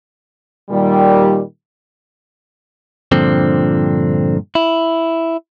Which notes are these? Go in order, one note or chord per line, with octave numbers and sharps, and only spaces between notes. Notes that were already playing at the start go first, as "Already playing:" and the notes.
A#2 D#3 G3
G2 A#2 D3 F3 C4
E4